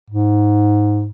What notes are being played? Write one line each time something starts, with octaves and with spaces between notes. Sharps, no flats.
G#2